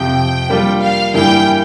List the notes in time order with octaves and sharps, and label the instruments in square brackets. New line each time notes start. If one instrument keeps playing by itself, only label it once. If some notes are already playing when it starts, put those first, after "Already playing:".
Already playing: [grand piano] F2 C3 F3 [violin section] G5
[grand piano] G3 A#3 D4 F4
[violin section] F5
[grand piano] G2 E3 G3 A#3 E4 [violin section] G5